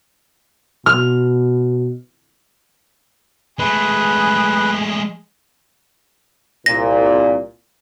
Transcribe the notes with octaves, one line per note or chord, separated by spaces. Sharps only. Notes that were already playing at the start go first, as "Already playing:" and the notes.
B2 F6
G#3 A3 G#4 B4
C2 A#2 A#6